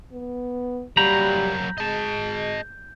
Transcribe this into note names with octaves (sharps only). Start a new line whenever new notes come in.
B3
F#3 G3 A#3 A#5 B5 G6
G#3 D#5 A5